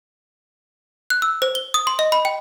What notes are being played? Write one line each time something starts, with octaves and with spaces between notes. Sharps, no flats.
F#6
E6
C5
G7
D#6
C6
D#5
B5
G5